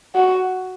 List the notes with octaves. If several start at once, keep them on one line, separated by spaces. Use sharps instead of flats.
F#4